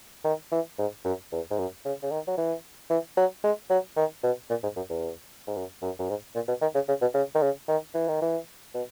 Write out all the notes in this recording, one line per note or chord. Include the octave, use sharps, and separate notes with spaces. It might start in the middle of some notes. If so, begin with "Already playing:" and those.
D#3
E3
G#2
F#2
E2
G#2
F#2
C#3
C#3
D#3
F#3
E3
E3
F#3
G#3
F#3
D#3
B2
A#2
G#2
F#2
E2
G#2
F#2
F#2
F#2
G#2
A#2
B2
D#3
C#3
C#3
B2
C#3
D#3
C#3
D#3
E3
D#3
E3
B2